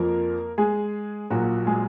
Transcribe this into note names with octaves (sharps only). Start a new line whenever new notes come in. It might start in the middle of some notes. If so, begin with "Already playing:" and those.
Already playing: F2 F3 A#3 A#4
G#3 G#4
A#1 A#2 F#3 F#4
G#3 G#4